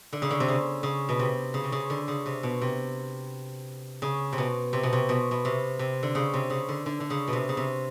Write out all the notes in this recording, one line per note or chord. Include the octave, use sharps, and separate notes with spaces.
D3
C#3
D3
C3
C#3
C#3
B2
C3
C#3
C3
C#3
D3
C#3
C3
B2
C3
C#3
C3
B2
C3
B2
C3
B2
B2
C3
C3
D3
C#3
C3
C#3
D3
D3
D3
C#3
B2
C3
C#3
C3